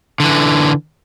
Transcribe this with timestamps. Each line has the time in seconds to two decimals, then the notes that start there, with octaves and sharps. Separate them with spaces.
0.20 D3 E3